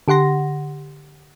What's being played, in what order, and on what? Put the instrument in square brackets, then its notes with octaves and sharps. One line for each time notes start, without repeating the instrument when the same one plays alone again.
[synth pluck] D3 G4 F#5 C6 A#6